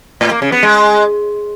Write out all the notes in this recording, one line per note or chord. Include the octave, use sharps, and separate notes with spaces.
A2
A#3
C#3
B3
G#3